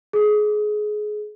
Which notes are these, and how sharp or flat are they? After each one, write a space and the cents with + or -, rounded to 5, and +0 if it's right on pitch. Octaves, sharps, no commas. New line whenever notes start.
G#4 +20